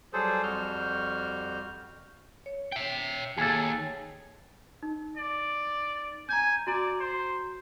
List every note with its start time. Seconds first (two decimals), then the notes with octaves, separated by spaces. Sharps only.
0.13 F#3 G3 G#4 A4 C5
0.43 F2 G3 F#4 F6 G6
2.46 C#5
2.72 E5 G5
3.38 D#2 G#4 A4
4.83 D#4
5.17 D5
6.29 G#5 A#5 G6
6.67 F#4 D5 A#5
7.00 C5